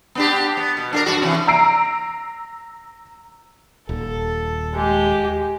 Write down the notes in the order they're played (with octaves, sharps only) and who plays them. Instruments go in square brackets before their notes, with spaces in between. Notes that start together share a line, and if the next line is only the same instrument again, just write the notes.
[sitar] B3 D4 G4
B3
B2
D4 F#4 A#4
G2 F#4
C3 E3
[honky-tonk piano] A#5 E6 C7 D7
[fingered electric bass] D#1 [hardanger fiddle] A4
[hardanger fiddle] G#3 G4